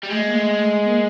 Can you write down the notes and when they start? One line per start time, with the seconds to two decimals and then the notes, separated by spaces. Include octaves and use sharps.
0.04 G3
0.11 G#3 A3
0.24 A#3
0.35 A3
0.59 A3
0.84 A#3